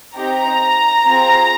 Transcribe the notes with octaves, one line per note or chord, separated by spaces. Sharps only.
C4 D#4 G4 A#5
C4 F4 G#4